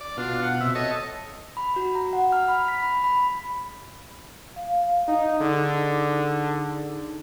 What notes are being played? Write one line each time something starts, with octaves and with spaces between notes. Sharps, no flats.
D5
B2 D4 F4
F#5
C3 E5
A4 C#5 D#5
B5
F#4
A#5
F#5
F6
B5
B6
B5
B5
F5
D#4
D3 D#4 G#4